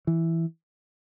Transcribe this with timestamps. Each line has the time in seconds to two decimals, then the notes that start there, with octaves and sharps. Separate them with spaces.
0.07 E3